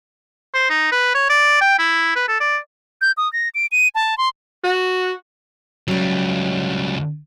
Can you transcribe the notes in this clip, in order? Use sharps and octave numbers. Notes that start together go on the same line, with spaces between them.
C5
D#4
B4
C#5
D5
G5
E4
B4
A4
D5
G6
D#6
A#6
D7
D#7
A5
C6
F#4
C#2 F#3 G3 C#4